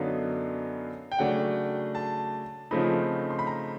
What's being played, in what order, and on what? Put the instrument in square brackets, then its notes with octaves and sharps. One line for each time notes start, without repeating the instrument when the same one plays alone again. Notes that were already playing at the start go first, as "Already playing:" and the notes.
Already playing: [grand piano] F#2 D3 F#3 B3 D#4 F5
G5
C#3 F#3 A3 D4 F#5
A5
C#3 F3 A3 C4 D#4 B5
C6
B5
A#5